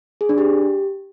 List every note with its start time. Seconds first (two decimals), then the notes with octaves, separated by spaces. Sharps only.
0.21 G#4
0.29 D4
0.38 G4